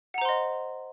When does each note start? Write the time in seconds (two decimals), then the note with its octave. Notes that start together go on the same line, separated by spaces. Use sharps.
0.14 F#5
0.18 A#5
0.22 C5
0.25 C6
0.29 D#5